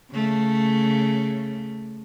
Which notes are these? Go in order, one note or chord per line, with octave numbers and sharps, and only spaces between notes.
C#3 A3